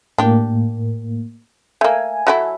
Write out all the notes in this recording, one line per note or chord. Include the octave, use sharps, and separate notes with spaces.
A2 A#3 D4 G4
A3 A#3 G#5
F#3 A3 E4